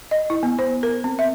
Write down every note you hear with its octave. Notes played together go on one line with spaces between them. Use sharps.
D#5
E4
B3
C5
A#4
C4
E5